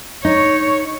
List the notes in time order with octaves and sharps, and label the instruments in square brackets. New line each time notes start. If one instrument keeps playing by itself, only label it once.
[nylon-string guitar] D#4 [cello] C#5